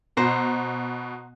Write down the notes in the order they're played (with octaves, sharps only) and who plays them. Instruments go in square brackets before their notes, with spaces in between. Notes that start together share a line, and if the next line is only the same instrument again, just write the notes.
[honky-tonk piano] B2 [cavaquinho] C5 A#5